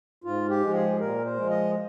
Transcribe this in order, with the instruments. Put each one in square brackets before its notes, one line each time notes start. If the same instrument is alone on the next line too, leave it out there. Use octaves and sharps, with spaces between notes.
[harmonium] G#2 F4
G4
F3 G#3
G#4
A#2 A#4
C5
F3 G#3
D#5